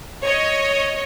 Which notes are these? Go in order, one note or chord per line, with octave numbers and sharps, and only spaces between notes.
C#5 D#5